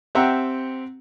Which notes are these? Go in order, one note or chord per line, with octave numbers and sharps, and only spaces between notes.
C4 G4 E5 F#5 G5 A#5